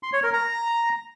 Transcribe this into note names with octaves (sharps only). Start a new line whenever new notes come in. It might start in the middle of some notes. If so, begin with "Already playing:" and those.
C6
C#5
A#4
A#5